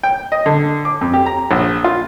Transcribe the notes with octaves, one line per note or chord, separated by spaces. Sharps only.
G5
D#5
D3
D6
F2
G4
A#5
A#1
F4